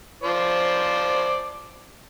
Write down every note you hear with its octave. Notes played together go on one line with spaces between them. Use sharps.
F3 C5 D5